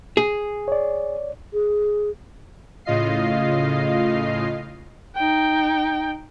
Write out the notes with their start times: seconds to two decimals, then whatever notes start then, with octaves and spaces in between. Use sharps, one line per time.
0.17 G#4
0.68 C#5 D5
1.53 G#4
2.85 A2 C#3 F4 D#5 F5 C7
5.16 D#4 G5